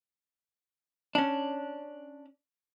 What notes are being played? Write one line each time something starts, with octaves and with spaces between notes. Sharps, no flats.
C#4 D4